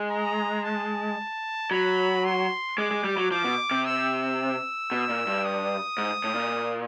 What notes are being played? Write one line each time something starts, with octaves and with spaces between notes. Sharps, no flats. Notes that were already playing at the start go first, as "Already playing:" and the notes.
Already playing: G#3
A#5
A5
F#3 B5
C6
G#3 D6
G#3
G3
F#3
F3 D6
B2
C3
E6
B2
A#2
G2
D#6
G#2
A2
A#2